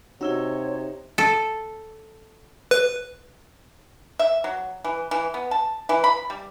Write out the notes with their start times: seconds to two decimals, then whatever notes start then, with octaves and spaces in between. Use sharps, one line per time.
0.21 C3 D#4 F#4 C#5 E6 G7
1.18 A4
2.71 B4
4.19 E5
4.44 F#3
4.84 E3
5.11 E3
5.34 B3
5.51 A5
5.89 E3
6.04 B5
6.30 G3